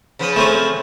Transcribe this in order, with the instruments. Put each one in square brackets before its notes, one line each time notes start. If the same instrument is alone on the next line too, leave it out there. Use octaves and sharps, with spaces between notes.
[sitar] C#3 F3 B3
[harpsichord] A3 C4 C#4